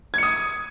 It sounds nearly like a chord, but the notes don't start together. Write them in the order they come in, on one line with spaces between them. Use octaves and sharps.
G#6 C#7 D#6